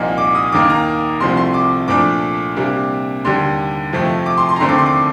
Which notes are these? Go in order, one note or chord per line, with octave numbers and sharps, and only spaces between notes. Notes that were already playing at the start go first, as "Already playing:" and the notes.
Already playing: C2 A#2 F3 A#3 D#4
D6
D#6
D#2 D#3 A#3 D6
A#5
C2 C3 F3 A3 C6
C6
D6
A#2 F3 A3 D4 D6
C3 G3 A#3 D4
D#2 D3 G3 C6
F2 C3 F3 A3
D6
C6
C6
A#5
D#2 D3 A3 C4 C6
D6
C6
D6